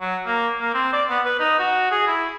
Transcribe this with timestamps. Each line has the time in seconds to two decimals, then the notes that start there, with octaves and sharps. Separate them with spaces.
0.01 F#3
0.26 A#3
0.61 A#3
0.74 C4
0.93 D5
1.10 B3
1.26 B4
1.40 D#4
1.59 F#4
1.91 G#4
2.08 E4